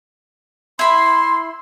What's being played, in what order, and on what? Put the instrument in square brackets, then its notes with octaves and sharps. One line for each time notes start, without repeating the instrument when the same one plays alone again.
[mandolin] E4 B5 [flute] C6